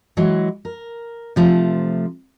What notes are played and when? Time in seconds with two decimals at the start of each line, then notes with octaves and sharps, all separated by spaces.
0.17 E3 F#3 G#3
0.65 A#4
1.36 C3 F3 A3